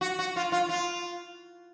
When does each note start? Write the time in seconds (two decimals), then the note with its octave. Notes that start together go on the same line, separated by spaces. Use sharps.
0.01 F#4
0.19 F#4
0.36 F4
0.52 F4
0.69 F4